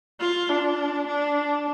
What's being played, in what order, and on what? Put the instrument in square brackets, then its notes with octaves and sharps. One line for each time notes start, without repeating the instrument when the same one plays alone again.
[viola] F4
D4
D4